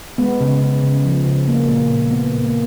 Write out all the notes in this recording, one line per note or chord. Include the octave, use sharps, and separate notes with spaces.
G#3 B3
C#3
C#3
C#3
F3
C#3
A#3
A#2 A#3
A#2
A#2 B3
A#2
A#3